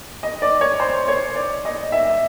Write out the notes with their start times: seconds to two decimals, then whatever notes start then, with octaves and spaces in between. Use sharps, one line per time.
0.23 D#5
0.42 D5
0.61 C#5
0.80 C5
1.08 C#5
1.36 D5
1.65 D#5
1.92 E5